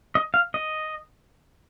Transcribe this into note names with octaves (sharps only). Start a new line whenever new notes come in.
D#5
F5
D#5